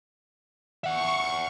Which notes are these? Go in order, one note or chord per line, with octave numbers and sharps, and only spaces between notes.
E5 F#5 C#6